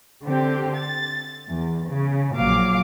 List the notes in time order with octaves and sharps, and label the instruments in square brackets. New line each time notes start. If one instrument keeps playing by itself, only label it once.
[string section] D3 C4 G4
A6
E2
C#3
A#1 A#2 F#3 F5 D6